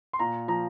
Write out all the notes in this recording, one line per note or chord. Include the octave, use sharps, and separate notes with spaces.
C6
A#2 A#5
F3 A#5